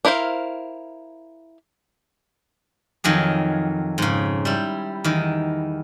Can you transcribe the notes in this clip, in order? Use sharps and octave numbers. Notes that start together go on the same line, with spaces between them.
D4 E4 A#4 C5 F5
F2 D#3 F#3 G#4
G#2 C#3
G3 E4
E2 D#3